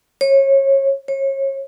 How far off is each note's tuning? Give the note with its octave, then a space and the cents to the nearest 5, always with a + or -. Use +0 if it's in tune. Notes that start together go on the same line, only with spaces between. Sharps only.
C#5 -25
C#5 -30